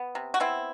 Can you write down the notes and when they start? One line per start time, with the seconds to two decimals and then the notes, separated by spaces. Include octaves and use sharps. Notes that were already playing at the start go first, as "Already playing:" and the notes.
Already playing: B3
0.15 C3
0.34 F#4
0.40 B3 C4 E4